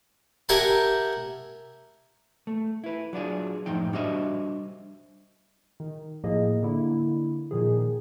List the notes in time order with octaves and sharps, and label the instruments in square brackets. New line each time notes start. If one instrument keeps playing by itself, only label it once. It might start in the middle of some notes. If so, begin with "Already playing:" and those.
[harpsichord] G4 A#4 E5 F#5 G#5 A5
[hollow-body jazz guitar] A3
E4 B4
F#3 D4 F4 G#4
F#2 A2 F3 D#4 G5
G3 D4 F#4 C5 D#5 E5
[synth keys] D#3
A2 F3 A#3 G#4 D#5
D3 A#3 E4
A#2 D#3 F3 G#4